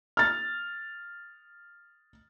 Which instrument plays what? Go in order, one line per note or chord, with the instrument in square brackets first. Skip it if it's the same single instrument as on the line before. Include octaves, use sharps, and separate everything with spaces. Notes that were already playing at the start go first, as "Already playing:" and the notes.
[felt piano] F6 A6